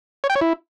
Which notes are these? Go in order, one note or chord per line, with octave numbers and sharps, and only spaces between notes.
C#5
G5
C#5
E4